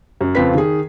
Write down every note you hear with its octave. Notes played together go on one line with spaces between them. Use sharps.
F#2
F2 C#3 C4 F4 B4 B6
D#3 G#4